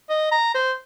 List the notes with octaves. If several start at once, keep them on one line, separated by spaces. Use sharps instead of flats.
D#5
A#5
C5